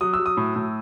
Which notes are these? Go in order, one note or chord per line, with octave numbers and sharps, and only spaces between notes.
F#3 D#6
E6
F#3
D#6
A2
A2